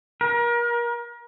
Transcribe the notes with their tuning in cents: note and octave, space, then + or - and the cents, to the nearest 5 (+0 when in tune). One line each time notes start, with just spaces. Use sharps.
A#4 +30